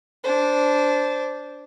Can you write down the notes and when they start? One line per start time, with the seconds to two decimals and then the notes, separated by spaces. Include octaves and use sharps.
0.24 D4 C5